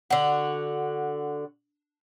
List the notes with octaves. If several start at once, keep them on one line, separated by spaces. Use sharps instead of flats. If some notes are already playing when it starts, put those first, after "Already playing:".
D3 F#4